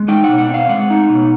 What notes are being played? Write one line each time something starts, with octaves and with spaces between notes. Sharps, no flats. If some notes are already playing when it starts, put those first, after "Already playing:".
Already playing: G#3
D#4 G5
B2 F#5
F#5
C4 F5
G#3 F#5
D#4
B2